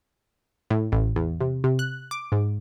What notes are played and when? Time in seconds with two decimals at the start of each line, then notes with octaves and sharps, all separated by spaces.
0.70 A2
0.92 A1
1.16 E2
1.40 C3
1.64 C3
1.79 F#6
2.11 D6
2.32 G#2